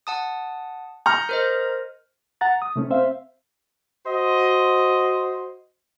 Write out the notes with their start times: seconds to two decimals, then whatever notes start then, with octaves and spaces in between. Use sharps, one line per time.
0.07 F#5 A5 D#6
1.06 A#5 F6 G6 C#7
1.29 A#4 C5 D#5
2.41 F#5 A#5 A6
2.62 D#6
2.76 C3 A3 C#4
2.90 C4 C5 E5 F5
4.05 F#4 C5 D#5